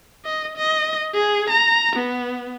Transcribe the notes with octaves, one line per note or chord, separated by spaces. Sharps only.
D#5
D#5
G#4
A#5
B3